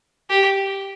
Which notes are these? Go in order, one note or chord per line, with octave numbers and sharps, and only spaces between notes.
G4